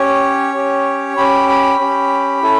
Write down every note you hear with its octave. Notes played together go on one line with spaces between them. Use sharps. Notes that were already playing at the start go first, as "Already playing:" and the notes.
Already playing: C#4 G4 C#5
C#4 G4
C#4 G4 B5
B5
C#4 G4
C#4 E4 A4